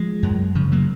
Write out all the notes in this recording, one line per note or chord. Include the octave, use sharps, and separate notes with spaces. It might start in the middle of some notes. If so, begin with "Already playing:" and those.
Already playing: F3 G#3
F#2
C#3 F3
F#3 A#3